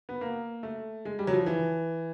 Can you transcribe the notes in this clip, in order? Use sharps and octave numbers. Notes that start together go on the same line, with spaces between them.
B3
A#3
A3
G#3
G3
F#3
F3
E3